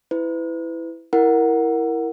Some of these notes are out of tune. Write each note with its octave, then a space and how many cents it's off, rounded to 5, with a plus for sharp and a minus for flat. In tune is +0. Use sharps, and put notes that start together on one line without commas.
E4 +0 B4 +30
E4 +0 A#4 +0 F#5 +0